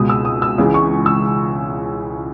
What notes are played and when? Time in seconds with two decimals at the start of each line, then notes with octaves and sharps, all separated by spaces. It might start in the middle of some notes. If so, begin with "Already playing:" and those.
Already playing: C#2 B2 G#3 D#6
0.10 E6
0.25 D#6
0.42 E6
0.58 C#2 C#3 E3 G#3
0.74 C#6
1.06 E6